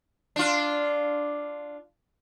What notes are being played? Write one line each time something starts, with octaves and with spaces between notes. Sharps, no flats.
D4 F4